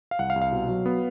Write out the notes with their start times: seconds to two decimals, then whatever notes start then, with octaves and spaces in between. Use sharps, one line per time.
0.11 F5
0.19 C2 F#5
0.30 F5
0.36 C2
0.42 F5
0.52 B2
0.69 F#3
0.86 B3